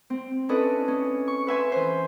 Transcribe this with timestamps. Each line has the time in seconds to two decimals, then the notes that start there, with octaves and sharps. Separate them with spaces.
0.10 C4
0.49 C#4 D4 E4 A4 B4 D#5
0.88 C#4
1.28 C#6
1.47 B4 E5 G#5 C6
1.72 E3 C5